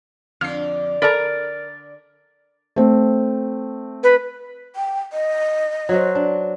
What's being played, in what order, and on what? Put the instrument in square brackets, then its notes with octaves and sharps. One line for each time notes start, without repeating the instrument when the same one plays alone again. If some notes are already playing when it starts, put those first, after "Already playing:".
[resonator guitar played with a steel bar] F2 [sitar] D3 D4 [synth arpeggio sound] F6 C7
[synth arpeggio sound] A4 D5 B5 [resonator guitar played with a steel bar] A#4 A#5 [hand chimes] A6
[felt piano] A3 C4
[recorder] B4
[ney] G5
D#5
[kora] F#3 F#4 C5
D4